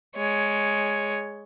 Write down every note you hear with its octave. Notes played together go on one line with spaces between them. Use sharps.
G#3 C#5